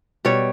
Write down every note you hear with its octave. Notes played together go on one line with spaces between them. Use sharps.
B2 G3 C#5